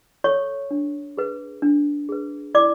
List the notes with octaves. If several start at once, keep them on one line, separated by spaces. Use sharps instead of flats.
A4 C#5 C#6
D4
G#4 B4
D4
G#4 B4
E4 D5 D6